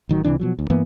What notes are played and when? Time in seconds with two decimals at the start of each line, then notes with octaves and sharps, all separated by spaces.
0.09 A1 D#3 F#3
0.24 C#2 C3 E3 D4
0.40 B2 F3 F#3
0.59 D2
0.70 G2 E3 A#3 B3